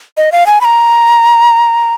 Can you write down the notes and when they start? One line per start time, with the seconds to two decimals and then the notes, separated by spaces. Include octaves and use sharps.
0.17 D#5
0.32 F5
0.46 G#5
0.61 B5
0.65 A#5